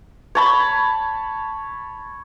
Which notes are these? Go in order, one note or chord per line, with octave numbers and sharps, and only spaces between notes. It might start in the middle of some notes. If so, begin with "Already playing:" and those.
C#5 A5 B5